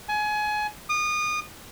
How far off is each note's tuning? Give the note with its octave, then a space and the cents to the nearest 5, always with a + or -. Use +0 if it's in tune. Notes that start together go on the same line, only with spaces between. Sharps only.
G#5 +25
D#6 -30